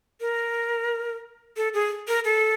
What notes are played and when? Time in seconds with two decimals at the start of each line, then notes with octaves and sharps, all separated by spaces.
0.21 A#4
1.57 A4
1.74 G#4
2.08 A#4
2.25 A4